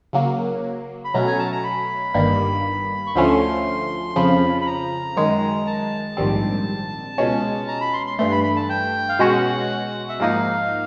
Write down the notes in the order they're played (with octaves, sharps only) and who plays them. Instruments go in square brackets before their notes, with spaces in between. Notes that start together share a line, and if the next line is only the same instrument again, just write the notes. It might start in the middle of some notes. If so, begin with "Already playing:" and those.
[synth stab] C#3 F#3 A#3
[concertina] B5
[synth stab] B2 F#3 A3 C#4 [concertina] A#5
[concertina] G#5
A5
A#5
B5
[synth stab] G1 G2 D#3 G3 A#3
[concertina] C#6
[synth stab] D2 D3 F3 A3 C#4 [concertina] C6
[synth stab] F2 C#3 F3 [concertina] B5
[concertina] B5
A#5
[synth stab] F#2 D#3 G#3
[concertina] A5
[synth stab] A#1 G#2 D#3 G3 C4
C#2 B2 G#3 C#4
[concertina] A#5
B5
C6
C6
[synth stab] G2 E3 A3 [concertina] C6
[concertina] B5
B5
A5
G5
F5
[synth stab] B2 G#3 C#4 F#4 [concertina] F#5
[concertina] E5
[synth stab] G#2 F3 A#3 D#4 [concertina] F5